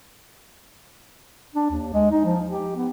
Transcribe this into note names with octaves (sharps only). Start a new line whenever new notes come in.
D4
D#2
G#3
D#4
F3
G4
B3